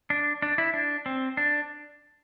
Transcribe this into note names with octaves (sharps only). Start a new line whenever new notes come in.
D4
D4
E4
D4
C4
D4